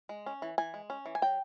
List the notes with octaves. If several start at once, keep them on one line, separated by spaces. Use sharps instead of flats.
G#3
C#4
E3
E3 G#5
G#3
C#4
E3
G#5
F#3 G5